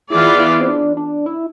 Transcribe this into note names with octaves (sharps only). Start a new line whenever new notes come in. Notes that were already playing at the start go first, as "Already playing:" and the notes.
E3 B3 E4 F4 G#4 D5
E4
C4
D4
D4
E4